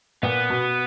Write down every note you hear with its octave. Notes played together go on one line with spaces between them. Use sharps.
A#2 B3
B2